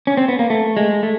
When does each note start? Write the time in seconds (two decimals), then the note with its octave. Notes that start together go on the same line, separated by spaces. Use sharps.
0.07 C#4
0.17 C4
0.28 B3
0.39 A#3
0.50 A3
0.77 G#3
1.03 A3